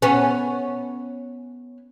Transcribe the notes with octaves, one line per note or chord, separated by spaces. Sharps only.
B3 C#4